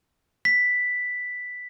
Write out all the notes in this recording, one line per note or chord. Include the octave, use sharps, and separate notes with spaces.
B6